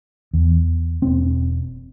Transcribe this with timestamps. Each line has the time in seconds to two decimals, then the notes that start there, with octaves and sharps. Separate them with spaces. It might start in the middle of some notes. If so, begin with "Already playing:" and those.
0.33 E2
1.02 E1 C4